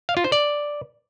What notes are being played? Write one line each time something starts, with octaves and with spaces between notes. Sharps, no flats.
F5
F4
C5
D5